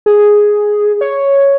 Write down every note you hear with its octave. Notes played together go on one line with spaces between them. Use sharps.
G#4
C#5